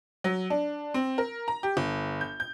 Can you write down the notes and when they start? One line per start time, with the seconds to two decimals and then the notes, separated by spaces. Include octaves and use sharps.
0.24 F#3
0.50 D4
0.94 C4
1.18 A#4
1.48 A#5
1.63 G4
1.77 G1
2.21 G6
2.40 G6